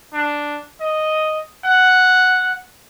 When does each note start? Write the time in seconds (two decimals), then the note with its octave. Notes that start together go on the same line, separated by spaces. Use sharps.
0.14 D4
0.80 D#5
1.64 F#5